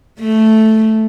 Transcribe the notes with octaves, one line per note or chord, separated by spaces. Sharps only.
A3